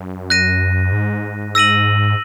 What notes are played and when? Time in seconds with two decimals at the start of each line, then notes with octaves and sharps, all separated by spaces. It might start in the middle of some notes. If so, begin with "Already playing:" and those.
Already playing: F#2
0.30 F#6 A#6 D#7
0.92 G#2
1.55 E6 A#6 D#7 F#7